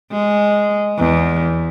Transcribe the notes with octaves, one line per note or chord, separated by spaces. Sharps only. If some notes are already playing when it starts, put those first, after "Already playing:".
G#3
E2